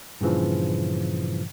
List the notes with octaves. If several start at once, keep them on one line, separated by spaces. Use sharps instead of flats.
G2 A#2 C#3 E3 F3